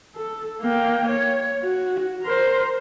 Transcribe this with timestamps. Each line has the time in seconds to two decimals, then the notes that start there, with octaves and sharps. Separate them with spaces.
0.15 A4
0.62 A#3 G5
1.08 C#5
1.64 F#4
2.23 A#4 C5